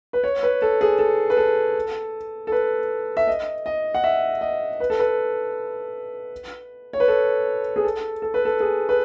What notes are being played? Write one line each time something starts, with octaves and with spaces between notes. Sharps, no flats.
B4
C#5
B4
A4
G#4
A4
B4
A4
A4
B4
E5
D#5
D#5
F#5
E5
D#5
B4
A4
B4
C#5
B4
A4
G#4
A4
A4
B4
A4
G#4
B4